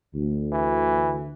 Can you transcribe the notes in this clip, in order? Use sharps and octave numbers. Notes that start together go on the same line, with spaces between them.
D2
E3